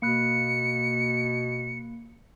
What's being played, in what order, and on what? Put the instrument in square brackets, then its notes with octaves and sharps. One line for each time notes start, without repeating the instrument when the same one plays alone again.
[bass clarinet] B2 [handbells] A#3 B5 F#6 [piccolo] C#7